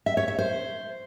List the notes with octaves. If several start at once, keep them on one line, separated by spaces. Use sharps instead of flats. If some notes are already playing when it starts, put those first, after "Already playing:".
E5
C#5
E5
C5